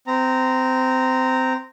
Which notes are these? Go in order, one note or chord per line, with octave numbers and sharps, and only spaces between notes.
C4 A#5